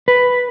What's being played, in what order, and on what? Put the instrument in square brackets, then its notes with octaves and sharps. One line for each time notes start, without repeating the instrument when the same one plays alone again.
[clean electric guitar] B4